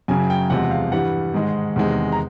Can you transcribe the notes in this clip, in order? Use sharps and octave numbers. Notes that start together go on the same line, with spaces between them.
F#2 C#3 F#3 G#5
G5
E2 C3 F3 G#3 F#5
F5
G2 E3 G3 F#5
G#2 D#3 G#3
E2 C3 D#3 G#3
A#5